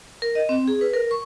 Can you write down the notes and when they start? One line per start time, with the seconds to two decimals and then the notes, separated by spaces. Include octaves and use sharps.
0.22 A#4
0.35 D#5
0.49 C4
0.68 G#4
0.81 B4
0.94 A#4
1.11 C#6